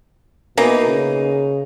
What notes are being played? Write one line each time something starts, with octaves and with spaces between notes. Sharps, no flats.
B2 E3 A#3 D#4
C#3